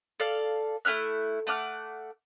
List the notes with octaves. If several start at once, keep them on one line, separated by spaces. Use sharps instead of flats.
A4 D5 F5
A3 E4 F6 F#6
A3 F#5 D6 F6